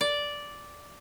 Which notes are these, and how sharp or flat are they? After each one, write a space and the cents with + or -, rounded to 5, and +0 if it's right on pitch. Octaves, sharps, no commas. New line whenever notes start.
D5 -5